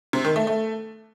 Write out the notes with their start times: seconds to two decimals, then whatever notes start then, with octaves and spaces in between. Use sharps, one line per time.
0.13 C3
0.25 D#3
0.36 A3
0.47 A3